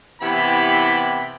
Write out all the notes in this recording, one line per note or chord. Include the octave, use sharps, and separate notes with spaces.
C3 E3 B3 E4 G4 B5